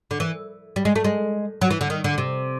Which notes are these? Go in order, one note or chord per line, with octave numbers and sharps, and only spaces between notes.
D3
E3
G3
G#3
A3
G#3
F#3
E3
D3
D#3
D3
C3